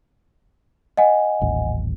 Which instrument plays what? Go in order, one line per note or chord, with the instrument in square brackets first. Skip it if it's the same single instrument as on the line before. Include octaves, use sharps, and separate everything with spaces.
[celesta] D#5 F#5 G#5
[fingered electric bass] D#1 A1